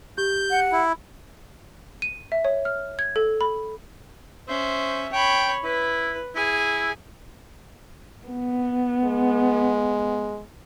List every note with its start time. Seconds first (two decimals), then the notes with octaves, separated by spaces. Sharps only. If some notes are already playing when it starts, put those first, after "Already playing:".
0.18 G4 G6
0.50 F#5
0.72 E4
2.02 D#7
2.32 E5
2.45 C#5
2.65 F6
2.99 G#6
3.16 A4
3.41 B5
4.48 C#4 C5 E5
5.12 C#5 G5 B5
5.64 E4 B4
6.35 E4 G#4 G#5
8.27 B3
9.04 G#3